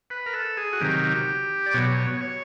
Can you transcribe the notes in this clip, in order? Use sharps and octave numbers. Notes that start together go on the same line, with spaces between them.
B4
A#4
A4
G#4
F#4
C3 D#3 F#3 G4
D5
B2 F#3 C#5
C#5
C#5